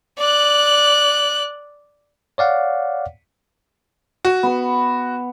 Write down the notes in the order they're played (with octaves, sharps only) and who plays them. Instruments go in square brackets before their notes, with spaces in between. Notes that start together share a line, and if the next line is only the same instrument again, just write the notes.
[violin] D5 F#6
[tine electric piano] C#5 D5 F5 F#5
[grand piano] F#4
[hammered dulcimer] B3 B4